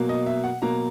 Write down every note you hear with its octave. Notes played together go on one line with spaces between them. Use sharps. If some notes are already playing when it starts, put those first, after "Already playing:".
Already playing: B2 F#3 A#3
D#5
E5
F#5
B2 F#3 A#3 A#5